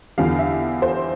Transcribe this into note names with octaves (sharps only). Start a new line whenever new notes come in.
E2 D3 G3 F5
E5
C5